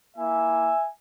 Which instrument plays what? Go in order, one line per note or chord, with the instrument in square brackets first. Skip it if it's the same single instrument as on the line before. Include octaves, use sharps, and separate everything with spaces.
[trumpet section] A#3 E4 E5 G#5